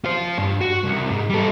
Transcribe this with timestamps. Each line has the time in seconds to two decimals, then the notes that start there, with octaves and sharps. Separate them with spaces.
0.04 F4 C5
0.38 G2
0.61 F#4
0.84 C2
1.11 G#2
1.30 G3 A4